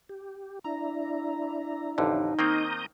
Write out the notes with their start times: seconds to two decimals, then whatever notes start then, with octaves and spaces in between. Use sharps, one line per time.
0.09 G4
0.64 D4 E4 A#5
1.98 A1 F2 D3 D#4
2.39 D#3 A#3 C4 A#5 D#6 G6